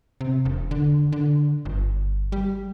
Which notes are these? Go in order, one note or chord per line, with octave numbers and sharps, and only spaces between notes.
C3
E1
D3
D3
G1
G3